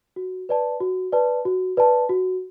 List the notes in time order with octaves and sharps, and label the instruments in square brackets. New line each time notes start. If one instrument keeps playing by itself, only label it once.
[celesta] F#4
B4 D5 A5
F#4
B4 D5 A5
F#4
B4 D5 A5
F#4